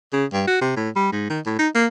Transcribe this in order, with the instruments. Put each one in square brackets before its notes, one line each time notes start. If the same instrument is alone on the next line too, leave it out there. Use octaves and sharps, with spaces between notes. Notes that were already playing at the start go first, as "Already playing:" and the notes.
[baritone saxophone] C#3
G2
F#4
C3
A2
G3
G#2
D#3
A2
D#4
A#3